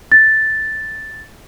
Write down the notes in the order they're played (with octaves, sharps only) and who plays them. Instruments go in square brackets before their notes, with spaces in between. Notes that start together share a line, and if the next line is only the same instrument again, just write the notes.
[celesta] A6